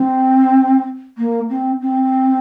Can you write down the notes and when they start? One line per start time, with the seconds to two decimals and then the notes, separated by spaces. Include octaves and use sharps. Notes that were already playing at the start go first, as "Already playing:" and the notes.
Already playing: C4
1.18 A#3
1.50 C4
1.81 C4